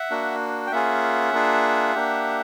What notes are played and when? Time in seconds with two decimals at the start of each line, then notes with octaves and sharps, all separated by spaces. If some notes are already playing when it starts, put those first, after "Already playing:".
Already playing: E5 F#5
0.10 A#3 D4 F#4
0.67 G5
0.71 A#3 C#4 F4 G#4 E5 F#5
1.33 A#3 D4 F4 G#4
1.95 A#3 D4 G4